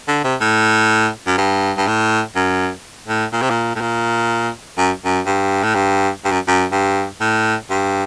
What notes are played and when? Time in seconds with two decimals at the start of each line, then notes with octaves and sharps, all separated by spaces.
0.08 D3
0.24 C3
0.41 A2
1.27 F#2
1.38 G2
1.78 G2
1.87 A2
2.36 F#2
3.08 A2
3.33 A#2
3.42 C3
3.50 A#2
3.76 A2
3.81 A#2
4.78 F#2
5.05 F#2
5.26 G2
5.63 A2
5.75 G2
6.24 G2
6.31 F#2
6.48 F#2
6.72 G2
7.21 A2
7.70 G2